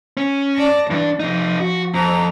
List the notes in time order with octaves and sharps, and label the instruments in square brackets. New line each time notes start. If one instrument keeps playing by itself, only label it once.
[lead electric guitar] C#4
[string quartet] D5 A5 A#6
[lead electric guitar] G2 D4 [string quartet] E3
[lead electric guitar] C3 D#4 [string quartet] F3
[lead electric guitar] F#4
[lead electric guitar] F2 [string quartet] A#5